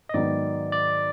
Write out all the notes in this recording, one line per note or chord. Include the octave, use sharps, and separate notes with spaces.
D#5
G#2 D#3 F#3 B3 D#4 D5
D5